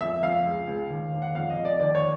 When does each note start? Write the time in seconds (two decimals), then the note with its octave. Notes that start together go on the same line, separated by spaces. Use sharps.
0.01 F2 E5
0.23 F2 F5
0.45 C#2
0.67 C#2
0.90 D#2
1.13 D#2
1.22 F#5
1.35 F2 F5
1.50 D#5
1.57 F2
1.65 D5
1.80 D#2 D5
1.95 C#5